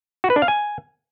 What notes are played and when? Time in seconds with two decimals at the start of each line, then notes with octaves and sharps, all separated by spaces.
0.24 F#4
0.30 B4
0.36 D4
0.42 F5
0.48 G#5